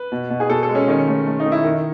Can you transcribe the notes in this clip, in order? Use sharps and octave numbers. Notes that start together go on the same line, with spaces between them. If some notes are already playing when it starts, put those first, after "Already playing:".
Already playing: B4
B2
B2
G#4
B2 A4
A4
G#3
C#4
D#3 C#4
A3
A3
D#4
D#3
E4
D#3